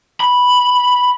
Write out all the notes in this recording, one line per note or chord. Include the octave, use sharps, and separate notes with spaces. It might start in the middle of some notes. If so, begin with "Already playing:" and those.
B5